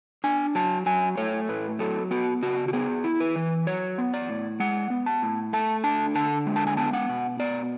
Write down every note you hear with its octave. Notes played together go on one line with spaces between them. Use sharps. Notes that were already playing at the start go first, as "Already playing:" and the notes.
D4 G#5
F#3 A5
F#3 G#5
A3 C#5
A2 B4
F#3 A4
B3 F#4
C#3 F#4
F#4
B3 G#4
E4
B4
E3
F#3 C#5
B3
D5
A2
G#3 F#5
B3
A5
A2
A3 A5
D4 A5
D3 A5
G#3
A5
G#5
B3 A5
F#5
B2
B3 D5